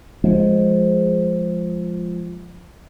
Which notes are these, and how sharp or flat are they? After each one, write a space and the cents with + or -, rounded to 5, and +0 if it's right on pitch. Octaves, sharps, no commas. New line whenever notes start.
F3 +0 G#3 +0